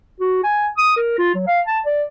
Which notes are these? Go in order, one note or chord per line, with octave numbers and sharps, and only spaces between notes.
F#4
G#5
D#6
A#4
F4
F#3
F5
A5
D5